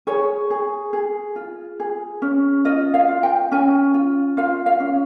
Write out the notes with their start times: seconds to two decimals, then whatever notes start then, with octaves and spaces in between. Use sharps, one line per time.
0.07 G#4 C#5
0.50 G#4
0.93 G#4
1.36 F4
1.80 G#4
2.22 C#4
2.65 F4 D#5
2.94 F5
3.08 F4
3.23 G5
3.51 C#4 G#5
3.94 F4
4.37 F4 F5
4.66 F5
4.80 C#4